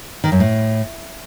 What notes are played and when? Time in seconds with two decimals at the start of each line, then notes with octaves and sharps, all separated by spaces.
0.24 D#3
0.32 F#2
0.40 A2